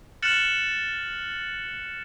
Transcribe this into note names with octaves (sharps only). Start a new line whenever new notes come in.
F6 F#6 A6 C#7 E7 F#7